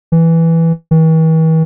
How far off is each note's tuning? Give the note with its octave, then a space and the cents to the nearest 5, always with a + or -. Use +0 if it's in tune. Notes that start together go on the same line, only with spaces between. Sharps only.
E3 +0
E3 -45